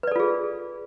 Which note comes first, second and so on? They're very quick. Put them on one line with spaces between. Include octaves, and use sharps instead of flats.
B4 D5 A4 F4 G#4